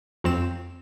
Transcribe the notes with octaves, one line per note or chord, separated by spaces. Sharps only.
F2 C4 E7